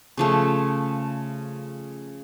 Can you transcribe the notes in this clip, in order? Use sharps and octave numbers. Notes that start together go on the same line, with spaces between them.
C#3 F3 A3